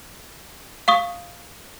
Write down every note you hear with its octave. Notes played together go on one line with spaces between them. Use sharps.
F5 C#6 D#6